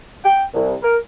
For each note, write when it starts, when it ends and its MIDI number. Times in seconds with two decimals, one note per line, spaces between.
0.25 0.43 79
0.54 0.75 36
0.83 0.97 70